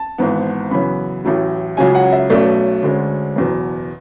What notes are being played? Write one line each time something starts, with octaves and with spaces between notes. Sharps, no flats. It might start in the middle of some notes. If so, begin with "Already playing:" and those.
Already playing: A5
G#1 G#2 E3 B3
F#2 C#3 E3 B3 B5
A1 A2 F#3
C#2 C#3 F#3 C#4 G#5
F#5
E5
B1 B2 A3 C#4 D5
D2 D3 G#3 C#4
F#1 E2 B2